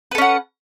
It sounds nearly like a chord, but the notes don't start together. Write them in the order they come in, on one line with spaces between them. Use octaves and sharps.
B4 A4 C#4 F#5